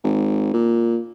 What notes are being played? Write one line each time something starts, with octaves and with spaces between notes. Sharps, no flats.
G#1
A#2